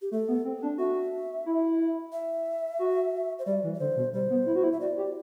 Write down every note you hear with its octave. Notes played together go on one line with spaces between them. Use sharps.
G4
A3 A4
B3
C4
D4
F#4 E5
E4
E5
F#4
C5
G3 D5
E3
D5
D3 C5
B2
G3 C5
B3
E4
F#4
E4
E5
F#4 D5
G4